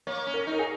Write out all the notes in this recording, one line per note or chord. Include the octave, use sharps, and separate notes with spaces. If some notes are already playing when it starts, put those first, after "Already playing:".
A#3 C#5
C#4
A#4
D#4
A#4
G#4